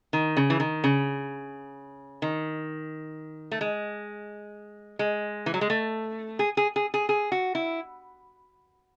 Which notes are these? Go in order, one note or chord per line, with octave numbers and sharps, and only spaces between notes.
D#3
C#3
E3
D#3
C#3
D#3
A3
G#3
G#3
E3
F#3
G#3
A3
G#4
G#4
G#4
G#4
G#4
F#4
E4